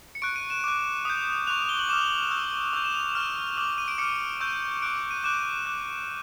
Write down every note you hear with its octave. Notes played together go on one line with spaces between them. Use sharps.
C#7
C#6 F#6 D7
D#7
E7
D6 F#6
D#6 G6
C#6 F#6 F7
G7
F#7
D6 F6 E7
C#6 E6 G6
C#6 E6 G6 F7
E7
F7
C#6 F6
D6 F6 F#7
D#7
D7
D6 F6 C#7
C#6 E6 G6
D6 F#6 D7
D7
D#7
D6 F#6 E7
D6 F#6